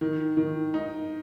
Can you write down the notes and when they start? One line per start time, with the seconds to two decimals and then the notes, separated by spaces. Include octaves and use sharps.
0.01 D#3
0.37 D#3
0.74 D#4